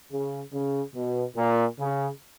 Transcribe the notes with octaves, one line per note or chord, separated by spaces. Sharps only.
C#3
C#3
B2
A#2
C#3